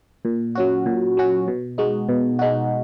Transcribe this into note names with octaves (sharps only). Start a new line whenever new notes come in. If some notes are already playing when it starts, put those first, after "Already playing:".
A#2
F#3 C#4 F#4
A#2
F#3 C#4 F#4
B2
G#3 D#4 F#4
B2
G#3 D#4 F#4